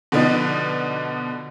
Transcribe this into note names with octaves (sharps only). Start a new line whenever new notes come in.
B2 D3 F3 B3 D4 D#4